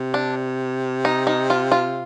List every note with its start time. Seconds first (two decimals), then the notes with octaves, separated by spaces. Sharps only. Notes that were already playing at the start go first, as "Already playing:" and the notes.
Already playing: C3
0.14 D4
1.05 D#4
1.27 D#4
1.50 F4
1.72 F4